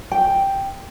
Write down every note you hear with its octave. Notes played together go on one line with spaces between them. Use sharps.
G5